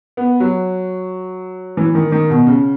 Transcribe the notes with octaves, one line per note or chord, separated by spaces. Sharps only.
B3
F#3
E3
D#3
D#3
B2
C#3